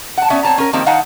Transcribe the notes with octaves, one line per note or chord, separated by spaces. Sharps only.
F#5 A5
B3 C#4 D5 E5
C4 C#5 A5 A#5
C#4 A#4
D#3 F3 G3 A#3 C4
D#3 D#4 F5 F#5 A5